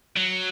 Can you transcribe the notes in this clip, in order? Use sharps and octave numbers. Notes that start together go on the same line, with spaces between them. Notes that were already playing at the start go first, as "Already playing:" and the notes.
F#3